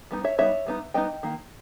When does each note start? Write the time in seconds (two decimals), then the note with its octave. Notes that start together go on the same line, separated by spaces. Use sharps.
0.11 G3 B3 D#4
0.24 C#5 E5
0.38 G3 B3 D#4 C#5 E5
0.67 G3 B3 D#4
0.94 G3 B3 D#4 D#5 G5
1.23 D#3 A#3